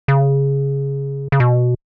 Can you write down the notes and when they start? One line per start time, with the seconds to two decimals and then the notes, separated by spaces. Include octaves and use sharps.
0.08 C#3
1.32 C#3
1.40 B2